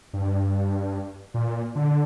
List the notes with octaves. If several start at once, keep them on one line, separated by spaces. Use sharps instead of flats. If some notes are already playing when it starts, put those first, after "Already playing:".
G2
A#2
D3